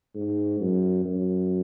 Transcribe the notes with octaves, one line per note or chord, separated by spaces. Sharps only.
G#2
F#2
F#2